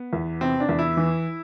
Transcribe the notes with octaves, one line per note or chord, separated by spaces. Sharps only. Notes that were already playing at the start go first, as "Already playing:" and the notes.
Already playing: B3
E2
C3 C4
D4
E2
E4
E3